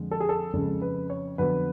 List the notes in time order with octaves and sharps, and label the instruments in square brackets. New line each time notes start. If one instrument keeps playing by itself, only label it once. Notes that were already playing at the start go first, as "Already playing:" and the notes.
Already playing: [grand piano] F2 D3 G#3
A4
G#4
A4
F2 C#3 G#3 A4
B4
C#5
F2 D3 F#3 B3 B4